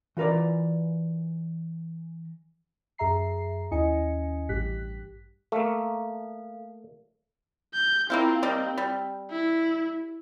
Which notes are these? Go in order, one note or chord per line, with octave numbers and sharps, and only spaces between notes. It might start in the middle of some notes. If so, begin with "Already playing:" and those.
E3 F4 A#4 B4 D5
F#2 G#4 E5 A#5 C7
D#2 C#4 E4 D#5 G#5 C#7
A1 G2 G4 F#6 B6
A3 A#3 A4 F5
G6
A#3 C4 E4 F4
G3 A#3 D#4
G3
E4